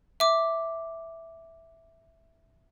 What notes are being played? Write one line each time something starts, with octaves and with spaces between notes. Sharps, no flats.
E5 D6